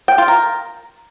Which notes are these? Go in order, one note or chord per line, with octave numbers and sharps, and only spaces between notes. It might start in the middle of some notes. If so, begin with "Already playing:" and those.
G5
F4
A#4